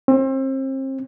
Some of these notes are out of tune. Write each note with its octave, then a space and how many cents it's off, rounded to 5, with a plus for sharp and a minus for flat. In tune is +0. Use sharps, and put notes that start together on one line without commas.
C4 +35